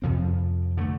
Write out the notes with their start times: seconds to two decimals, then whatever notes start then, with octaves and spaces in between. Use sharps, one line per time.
0.02 F2 C3 F3 C4
0.77 D3 F3 A3